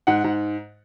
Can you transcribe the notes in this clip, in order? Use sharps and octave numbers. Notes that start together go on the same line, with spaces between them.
G#2 F#5
G#2